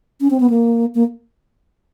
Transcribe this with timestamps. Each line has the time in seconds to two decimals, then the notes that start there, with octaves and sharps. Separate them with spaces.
0.21 C#4
0.30 C4
0.40 B3
0.50 A#3
0.95 A#3